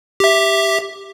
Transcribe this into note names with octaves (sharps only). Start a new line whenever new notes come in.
G4 E5